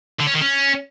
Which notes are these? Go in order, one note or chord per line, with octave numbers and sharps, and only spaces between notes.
D3
C#4
D#3
C#4